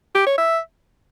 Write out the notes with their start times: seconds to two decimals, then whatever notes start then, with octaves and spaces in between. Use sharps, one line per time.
0.15 G4
0.27 C#5
0.38 E5